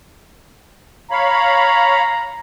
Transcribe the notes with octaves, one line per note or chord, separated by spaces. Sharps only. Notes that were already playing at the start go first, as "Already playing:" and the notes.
C#5 F5 A#5 B5